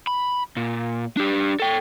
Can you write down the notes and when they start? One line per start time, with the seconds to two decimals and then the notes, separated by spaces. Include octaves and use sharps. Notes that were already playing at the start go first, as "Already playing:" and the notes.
0.07 B5
0.57 A#2
1.17 D4 G4
1.60 A4 G5